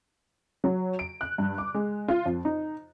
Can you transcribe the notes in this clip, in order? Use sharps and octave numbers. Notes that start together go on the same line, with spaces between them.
F#3
D7
F#6
G2
D6
G#3
F4
F2
D#4